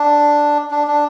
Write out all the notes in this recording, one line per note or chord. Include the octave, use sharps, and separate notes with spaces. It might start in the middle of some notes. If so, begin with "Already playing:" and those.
Already playing: D4
D4
D4